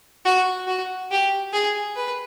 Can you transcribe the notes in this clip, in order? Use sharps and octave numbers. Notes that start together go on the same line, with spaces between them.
F#4
F#4
G4
G#4
B4